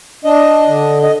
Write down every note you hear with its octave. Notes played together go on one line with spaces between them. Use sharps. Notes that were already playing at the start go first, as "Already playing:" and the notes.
D4 D#5
D3
D#5